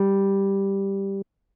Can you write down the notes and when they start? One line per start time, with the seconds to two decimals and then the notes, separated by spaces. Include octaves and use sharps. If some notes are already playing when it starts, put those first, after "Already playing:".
Already playing: G3